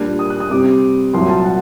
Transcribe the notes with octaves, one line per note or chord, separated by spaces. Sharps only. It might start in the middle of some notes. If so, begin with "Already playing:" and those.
Already playing: A#2 G3 D4
D#6
F#6
D#6
C3 G3 C4 D6
C2 A#2 F#3 C6
A5
F#5